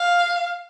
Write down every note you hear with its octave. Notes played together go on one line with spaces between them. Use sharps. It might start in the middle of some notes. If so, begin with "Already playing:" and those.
Already playing: F5